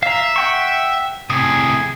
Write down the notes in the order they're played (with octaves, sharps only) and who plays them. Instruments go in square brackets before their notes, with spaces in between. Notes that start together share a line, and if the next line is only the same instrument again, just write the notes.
[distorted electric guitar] E5 [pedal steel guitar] F5 A#5
[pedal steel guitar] F#5 G5 C#6
[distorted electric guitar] A2 C3 [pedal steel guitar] G#4 D#6